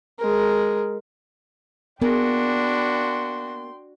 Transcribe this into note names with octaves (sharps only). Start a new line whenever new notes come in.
G#3 A#4
A#3 B3 D4 F#4 G#4 A#4 G5 C6